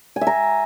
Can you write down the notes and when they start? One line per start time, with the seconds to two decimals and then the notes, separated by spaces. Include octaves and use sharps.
0.16 G#5
0.21 E5
0.27 A#5